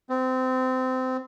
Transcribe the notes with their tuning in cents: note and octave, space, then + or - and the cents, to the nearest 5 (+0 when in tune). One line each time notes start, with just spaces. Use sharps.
C4 -25